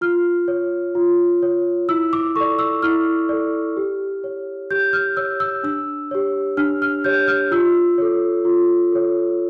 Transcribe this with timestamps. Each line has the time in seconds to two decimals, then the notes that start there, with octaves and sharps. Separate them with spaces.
0.01 F4 F6
0.48 C#5
0.95 F4
1.43 C#5
1.89 E4 E6
2.13 D6
2.36 A4 D5 C#6
2.59 E6
2.83 E4 F6
3.29 A4 D5
3.77 G4
4.24 C#5
4.71 G4 G6
4.93 F6
5.17 C#5 E6
5.40 E6
5.63 D4 E6
6.11 G4 C#5
6.57 D4 F6
6.82 F6
7.04 G4 C#5 G6
7.28 F6
7.51 F4 E6
7.98 A4 C#5
8.45 F4
8.92 A4 C#5